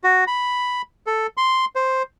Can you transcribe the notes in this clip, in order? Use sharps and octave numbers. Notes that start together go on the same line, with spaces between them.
F#4
B5
A4
C6
C5